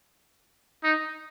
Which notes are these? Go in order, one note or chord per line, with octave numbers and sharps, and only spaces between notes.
D#4